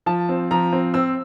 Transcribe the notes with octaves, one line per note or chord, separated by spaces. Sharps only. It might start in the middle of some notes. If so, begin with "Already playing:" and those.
F3 A5
C4
F3 A#5
C4
C4 E6